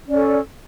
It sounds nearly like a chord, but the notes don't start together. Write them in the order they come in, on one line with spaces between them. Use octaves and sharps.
C#4 D5 A4